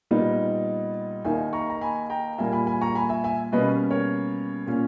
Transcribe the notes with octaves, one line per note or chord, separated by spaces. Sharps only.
A#2 G3 B3 D#4 A#4
D#2 D#3 A#3 D#4 E5 G#5
A#5 C#6
A#5
G#5 B5
G5 A#5
A#2 G3 A#3 E5 G#5
G#5 B5
G#5 B5
A#5 C#6
G#5 B5
E5 G#5
E5 G#5
B2 G3 A#3 C#4 B4 D#5
A#4 C#5
A#2 A#3 C#4